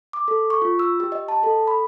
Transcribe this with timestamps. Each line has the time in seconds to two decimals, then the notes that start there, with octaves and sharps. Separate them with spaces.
0.13 D6
0.28 A4
0.50 C#6
0.62 F4
0.79 E6
1.00 G4
1.12 D#5
1.28 A5
1.43 A4
1.67 B5